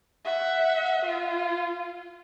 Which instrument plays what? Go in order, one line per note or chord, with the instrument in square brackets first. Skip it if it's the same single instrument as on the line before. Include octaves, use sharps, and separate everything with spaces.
[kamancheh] E5 F#5
F4